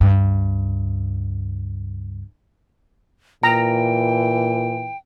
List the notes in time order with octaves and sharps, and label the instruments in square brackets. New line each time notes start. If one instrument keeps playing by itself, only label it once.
[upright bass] C#2 G2
[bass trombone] A#2 [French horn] E3 [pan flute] G5 [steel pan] A#5